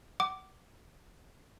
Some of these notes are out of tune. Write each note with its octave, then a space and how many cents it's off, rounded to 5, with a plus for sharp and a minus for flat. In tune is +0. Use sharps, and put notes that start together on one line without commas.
F#5 +35 D6 +0